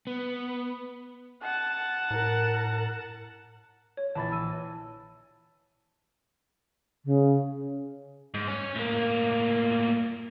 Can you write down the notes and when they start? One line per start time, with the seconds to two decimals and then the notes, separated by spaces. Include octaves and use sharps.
0.07 B3
1.42 F#5 A5
2.11 A2 A#4
3.97 C#5
4.15 A#1 E3 A5 B5 A6
4.31 A5 E6 D#7
7.05 C#3
8.34 G#2
8.48 C#4
8.76 A2 A#3